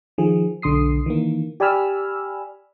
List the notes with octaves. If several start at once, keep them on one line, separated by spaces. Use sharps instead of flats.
D#3 F3 G#4
B1 D3 C6 D#6 C7
D#3 E3 A#3
G4 D5 G#5 B5 E6 F6